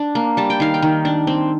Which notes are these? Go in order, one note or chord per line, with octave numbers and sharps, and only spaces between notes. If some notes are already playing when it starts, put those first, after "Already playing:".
Already playing: D4
A#3
G3 A5
G5
D#3 F5
G5
D#3
D4
C4